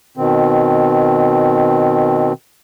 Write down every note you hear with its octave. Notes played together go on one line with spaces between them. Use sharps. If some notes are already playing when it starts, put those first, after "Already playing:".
B2 D#3 C4